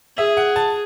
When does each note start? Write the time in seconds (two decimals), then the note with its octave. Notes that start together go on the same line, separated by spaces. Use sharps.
0.17 G#4 E5
0.37 F#5
0.56 A5